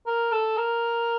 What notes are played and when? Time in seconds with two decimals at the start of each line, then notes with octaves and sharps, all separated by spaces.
0.07 A#4
0.32 A4
0.57 A#4